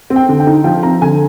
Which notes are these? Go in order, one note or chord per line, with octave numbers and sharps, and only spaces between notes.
C4
G5
D3
G5
D#4
F3 G5
C4 A#5
D3 G#5